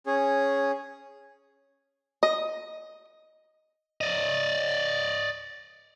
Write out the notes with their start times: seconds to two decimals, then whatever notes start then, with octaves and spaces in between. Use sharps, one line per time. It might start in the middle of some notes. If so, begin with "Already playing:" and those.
0.06 C#4 G#4
2.23 D#5
4.01 D5 D#5